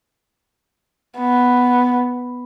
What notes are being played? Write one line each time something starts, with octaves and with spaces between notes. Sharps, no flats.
B3